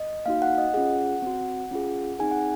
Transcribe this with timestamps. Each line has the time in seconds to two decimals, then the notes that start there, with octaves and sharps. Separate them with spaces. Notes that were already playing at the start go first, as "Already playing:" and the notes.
Already playing: D#5
0.26 A#3 D#4 F#4 F5
0.42 F#5
0.58 D#5
0.74 C#4 F4 G#4 F#5
1.22 C4 F#4
1.71 C#4 F4 G#4
2.19 C4 D#4 G#4 G#5
2.31 F#5